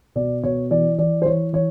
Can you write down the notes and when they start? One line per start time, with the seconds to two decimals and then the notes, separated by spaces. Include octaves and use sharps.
0.16 B2 D5
0.43 B2 C#5
0.70 E3 D5
0.98 E3 D5
1.22 C5
1.25 E3 C#5
1.53 E3 C#5